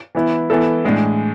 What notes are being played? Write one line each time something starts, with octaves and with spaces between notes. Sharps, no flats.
E3 B3 E4
E3 B3 E4 A4
A2 E3 G#3 D4 G#4